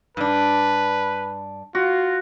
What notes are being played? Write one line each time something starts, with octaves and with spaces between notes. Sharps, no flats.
G2 D4 B4
F4 F#4